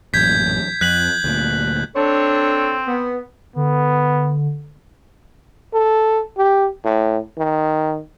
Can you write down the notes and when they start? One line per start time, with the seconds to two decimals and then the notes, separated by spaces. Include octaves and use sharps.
0.14 A1 F#2 A#2 G6 G#6 B6
0.81 F2 F#6 B6 F#7
1.24 D2 A#2
1.96 C4 D4 A4 C#5
2.88 B3
3.56 D3 B3
5.73 A4
6.37 G4
6.84 A2
7.38 D#3